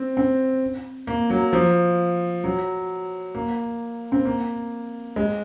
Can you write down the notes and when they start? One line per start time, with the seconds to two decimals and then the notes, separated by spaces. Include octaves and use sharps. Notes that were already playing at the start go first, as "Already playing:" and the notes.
Already playing: C4
0.17 C4
1.07 A#3
1.30 F#3
1.53 F3
2.44 F#3
3.35 A#3
4.12 C4
4.25 A#3
5.16 G#3